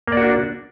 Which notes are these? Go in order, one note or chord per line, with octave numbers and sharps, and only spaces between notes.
A#3 D4 F#4 D5